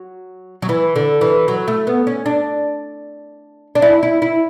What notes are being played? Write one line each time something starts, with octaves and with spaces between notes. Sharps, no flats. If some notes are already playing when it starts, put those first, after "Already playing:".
Already playing: F#3
F#3
E3
D3
E3
F#3
A3
B3
C#4
D4
D4
E4
E4
E4